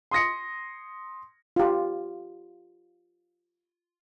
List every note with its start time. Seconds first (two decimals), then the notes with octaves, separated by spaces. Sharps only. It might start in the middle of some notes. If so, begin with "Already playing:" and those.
0.11 C6 D#6 A#6 C#7
1.56 F4 G4